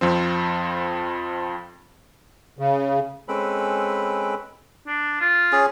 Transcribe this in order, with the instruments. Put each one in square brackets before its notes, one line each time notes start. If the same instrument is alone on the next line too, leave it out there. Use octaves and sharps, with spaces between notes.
[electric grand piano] F2 F3 C4
[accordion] C#3
[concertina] G#3 C4 C#4 A4 B4 B5
[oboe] D4
F4
[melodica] C#4 G#4